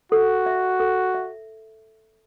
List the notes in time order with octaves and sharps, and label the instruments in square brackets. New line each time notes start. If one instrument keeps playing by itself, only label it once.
[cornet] F#4 [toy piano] A4
[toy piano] E5
A4
E5